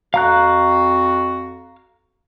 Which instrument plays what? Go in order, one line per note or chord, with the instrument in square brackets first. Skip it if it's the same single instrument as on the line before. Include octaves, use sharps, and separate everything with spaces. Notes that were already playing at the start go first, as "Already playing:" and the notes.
[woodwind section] F2 F#4 [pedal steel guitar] F5 A#5 F#6